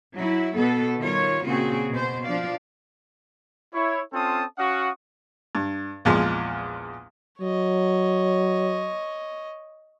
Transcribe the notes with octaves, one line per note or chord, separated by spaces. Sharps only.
F#3 E4
B2 B3 A4
D#3 G3 F4 C#5
A#2 C#3 C4 F#4 G#4
B2 C5
F3 D4 D5 F5
E4 C#5
C4 C#4 F4 A4 A5 D#6
C#4 F#4 F5 F#5 C#6 D#6
G2
A#1 E2 F3 G#3
F#3 C#5 D#5